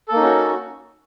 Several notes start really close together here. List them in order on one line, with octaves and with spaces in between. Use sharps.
A4 A#3 D#4 C#4 F#4